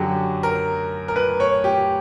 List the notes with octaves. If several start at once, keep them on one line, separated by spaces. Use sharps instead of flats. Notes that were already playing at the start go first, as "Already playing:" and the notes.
Already playing: F#2 D3 F#3 G4
A#4
A#4
B4
C#5
G4